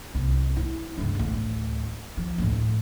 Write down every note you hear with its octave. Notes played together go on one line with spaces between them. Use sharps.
C2
E4
G1 C#2
A1 D2
F3
D2 A2